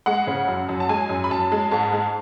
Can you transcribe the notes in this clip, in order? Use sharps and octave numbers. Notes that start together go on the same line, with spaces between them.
G#3 F#5
C#3
F#2
F#2
A5
G#3 G#5
F#2
B5
F#2 A5
G#3
G#2 A5
G#3